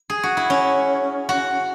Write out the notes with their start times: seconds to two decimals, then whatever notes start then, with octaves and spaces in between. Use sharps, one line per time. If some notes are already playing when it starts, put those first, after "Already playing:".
Already playing: B4
0.10 G#4
0.23 F#4
0.37 E4
0.50 C#4
1.29 F#4